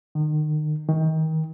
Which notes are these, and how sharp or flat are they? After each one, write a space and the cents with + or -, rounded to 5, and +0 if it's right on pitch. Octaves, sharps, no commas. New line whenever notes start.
D#3 -35
D#3 +30